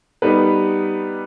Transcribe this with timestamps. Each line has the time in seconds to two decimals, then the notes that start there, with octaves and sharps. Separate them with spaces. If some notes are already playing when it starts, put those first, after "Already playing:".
0.22 G3 B3 D#4 B4